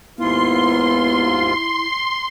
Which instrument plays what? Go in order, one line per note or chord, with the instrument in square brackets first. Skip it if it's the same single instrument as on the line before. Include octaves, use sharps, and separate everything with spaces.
[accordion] D#2 G#2 F4 [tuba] B3 [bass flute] E4 [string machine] C6